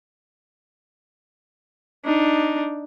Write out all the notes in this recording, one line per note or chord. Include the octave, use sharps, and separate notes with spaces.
D4 D#4